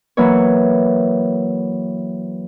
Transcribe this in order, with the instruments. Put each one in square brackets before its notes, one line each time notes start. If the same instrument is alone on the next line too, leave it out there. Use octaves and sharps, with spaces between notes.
[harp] E3 F#3 A#3 E4 B4 C#5